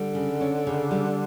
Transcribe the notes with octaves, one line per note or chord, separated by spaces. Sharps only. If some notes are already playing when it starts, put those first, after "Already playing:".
Already playing: D3 G3
C#3
C#4
C#3
G3